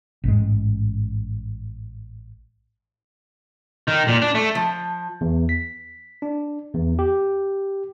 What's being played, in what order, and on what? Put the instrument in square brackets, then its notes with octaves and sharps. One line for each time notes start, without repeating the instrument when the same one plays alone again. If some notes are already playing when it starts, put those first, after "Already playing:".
[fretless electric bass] A1 G#2 G#3
[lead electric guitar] D#3
A#2
D4
A3
[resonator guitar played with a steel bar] F3
[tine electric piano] E2
B6
D4
E2
G4